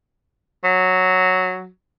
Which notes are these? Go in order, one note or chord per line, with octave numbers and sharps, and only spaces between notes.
F#3